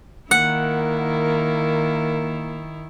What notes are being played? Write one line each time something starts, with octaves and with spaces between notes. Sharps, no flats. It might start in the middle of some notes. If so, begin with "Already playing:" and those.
D#3 A#3 E4 F#5